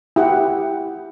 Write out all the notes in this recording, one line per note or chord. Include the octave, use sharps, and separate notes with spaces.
E4 G4 F#5